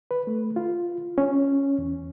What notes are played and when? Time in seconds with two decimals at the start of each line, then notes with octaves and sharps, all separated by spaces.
0.11 B4
0.27 A3
0.56 F4
1.18 C#4
1.78 E2